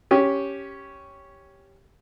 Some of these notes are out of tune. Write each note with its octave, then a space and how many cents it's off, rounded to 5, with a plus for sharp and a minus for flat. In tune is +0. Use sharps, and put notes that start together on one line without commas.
C#4 +0 G4 +0